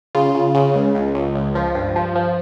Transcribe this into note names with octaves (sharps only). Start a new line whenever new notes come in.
C#3 F4
C#3
C#3
C#2
C#2
C#2
C#2
F3
G2
F3
F3